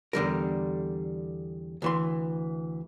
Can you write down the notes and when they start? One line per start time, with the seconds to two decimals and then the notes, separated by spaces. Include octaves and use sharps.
0.13 E2 D3 G3 A#4
1.82 D2 E3 C6